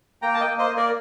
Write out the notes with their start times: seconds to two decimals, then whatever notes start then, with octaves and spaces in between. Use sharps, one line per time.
0.22 A#3 G5 A#5
0.34 A5
0.40 D#5 G5
0.46 A#3
0.58 C5 D#5
0.70 A#3
0.77 A#4 D5